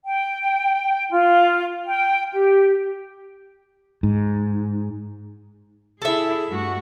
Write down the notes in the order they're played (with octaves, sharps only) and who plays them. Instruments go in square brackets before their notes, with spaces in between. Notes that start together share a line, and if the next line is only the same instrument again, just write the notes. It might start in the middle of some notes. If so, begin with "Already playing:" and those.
[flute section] G5
F4
G5
G4
[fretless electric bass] G#2
[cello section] E4 G#4 [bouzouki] A4 E5
[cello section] G2 A3 F#4